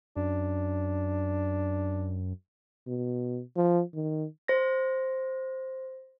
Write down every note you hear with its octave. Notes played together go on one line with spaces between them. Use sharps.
F#2 D4
B2
F3
D#3
C5 A#6